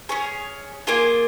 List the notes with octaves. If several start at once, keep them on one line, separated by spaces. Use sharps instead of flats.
C#4 G#4 C#5
A#3 F4 G#4